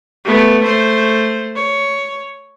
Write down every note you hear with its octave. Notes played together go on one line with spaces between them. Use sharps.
A3 B3
A3 C5
C#5